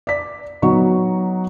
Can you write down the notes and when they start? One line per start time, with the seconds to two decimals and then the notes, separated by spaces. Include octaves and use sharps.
0.07 D5 B6
0.62 F#3 B3 D#4 F#4 C#6